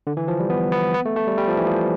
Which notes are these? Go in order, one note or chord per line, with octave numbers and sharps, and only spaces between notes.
D3
E3
F3
G3
B3
B3
B3
A3
A3
G3
G3
F3
E3
F3